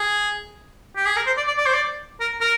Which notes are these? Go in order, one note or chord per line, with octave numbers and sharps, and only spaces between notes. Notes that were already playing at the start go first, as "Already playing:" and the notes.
Already playing: G#4
G4
G#4
A#4
C5
D5
D5
D5
C5
D5
A#4
A#4